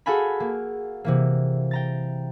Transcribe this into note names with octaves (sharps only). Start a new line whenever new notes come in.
F#4 G#4 A4 F5 G#5 B5
A#3
C3 E3 A#3
G5 A#5 A6